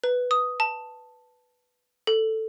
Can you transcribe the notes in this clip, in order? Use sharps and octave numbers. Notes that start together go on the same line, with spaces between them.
B4
D#6
A5
A4